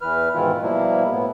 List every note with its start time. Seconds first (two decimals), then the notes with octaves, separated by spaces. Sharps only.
0.01 E2 E3 B4 F6
0.35 G#2 B2 D#3 E3 E4 F4
0.62 B2 F3 G3 A#3 E4
1.12 A2 B3